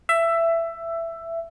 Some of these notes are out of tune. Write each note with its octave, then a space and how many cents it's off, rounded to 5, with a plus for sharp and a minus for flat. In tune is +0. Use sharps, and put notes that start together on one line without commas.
E5 +15